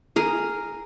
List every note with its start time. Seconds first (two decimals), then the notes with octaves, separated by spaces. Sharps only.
0.16 G#4 A#4